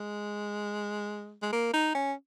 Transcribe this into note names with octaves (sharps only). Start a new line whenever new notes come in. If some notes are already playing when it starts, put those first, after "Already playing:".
Already playing: G#3
G#3
A#3
D#4
C#4